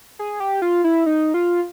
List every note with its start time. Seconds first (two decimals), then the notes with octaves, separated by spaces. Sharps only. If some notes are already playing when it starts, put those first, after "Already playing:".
0.19 G#4
0.40 G4
0.62 F4
0.84 E4
1.06 D#4
1.34 F4